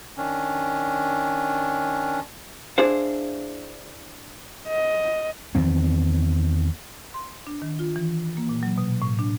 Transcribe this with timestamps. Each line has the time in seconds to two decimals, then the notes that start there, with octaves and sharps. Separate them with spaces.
0.17 D#3 C#4 D4
2.78 D4 E4 G#4 C5 F5
4.68 D#5
5.55 E2 D#3 C4
7.14 C6
7.47 D4
7.62 D#3
7.79 F4
7.96 E3
8.37 A#3
8.49 A#2
8.63 F#3
8.78 B2
9.02 A2
9.19 D4